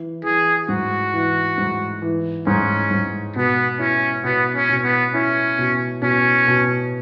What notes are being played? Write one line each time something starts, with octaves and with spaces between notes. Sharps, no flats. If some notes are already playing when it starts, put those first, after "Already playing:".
Already playing: E3
E3 G#4
G#2 F#4
E3
G#2
E3
G#2 C#4
G#2
B2 B3
C#4 E4
B2 B3
C#4
B2
B3
C#4 E4
B2
B2 C#4
B2